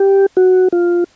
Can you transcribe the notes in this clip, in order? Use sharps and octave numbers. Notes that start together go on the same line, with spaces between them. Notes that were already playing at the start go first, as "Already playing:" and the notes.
Already playing: G4
F#4
F4